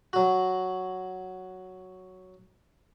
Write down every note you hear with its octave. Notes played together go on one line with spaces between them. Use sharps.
F#3 F#4